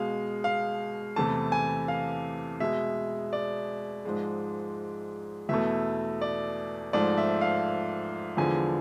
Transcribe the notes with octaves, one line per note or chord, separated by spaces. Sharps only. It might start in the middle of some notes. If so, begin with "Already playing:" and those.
Already playing: B2 G#3 F5
F5
E2 C3 E3 A3 A5
G#5
F5
B2 G#3 E5
D5
G#2 F3 G#3
E2 B2 A3 E5
D5
G#2 F3 A3 D5
E5
F5
E2 D3 F3 G#3 G#5